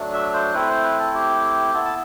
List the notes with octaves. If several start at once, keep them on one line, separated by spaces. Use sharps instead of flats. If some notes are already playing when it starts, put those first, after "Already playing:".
Already playing: F#3 A3 D4
E5
C5
A3 C4 E4 B4
C5
B4
A4
G4
B3 E4 A4
A5